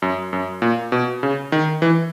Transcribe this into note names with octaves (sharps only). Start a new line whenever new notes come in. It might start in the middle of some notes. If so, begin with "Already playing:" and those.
F#2
F#2
A#2
B2
C#3
D#3
E3